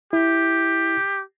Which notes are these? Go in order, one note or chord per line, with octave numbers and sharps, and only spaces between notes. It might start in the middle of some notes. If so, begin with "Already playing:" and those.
E4 G4